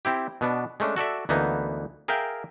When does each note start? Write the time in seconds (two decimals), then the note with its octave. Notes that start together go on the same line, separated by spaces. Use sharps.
0.05 C4 E4 G4
0.41 B2 B3 D4
0.80 G#3 A3 C#4 D4
0.96 F#4 A4 D5 E5
1.29 D2 E3 A#3 B3 D#4
2.08 G#4 A#4 E5 F5 G5